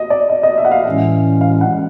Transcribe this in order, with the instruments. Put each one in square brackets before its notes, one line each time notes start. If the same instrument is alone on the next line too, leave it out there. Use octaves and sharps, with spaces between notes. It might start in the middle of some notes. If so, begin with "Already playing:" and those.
Already playing: [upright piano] D#5
D5
D#5
D#5
E5
F#5
F5
[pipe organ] A2 E3 G#3 C#4
[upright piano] F5
F#5